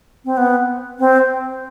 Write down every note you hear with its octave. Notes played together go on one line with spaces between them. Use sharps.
C4
B3
C4